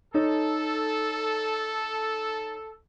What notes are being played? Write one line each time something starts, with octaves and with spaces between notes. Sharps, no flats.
D#4 A4 C#5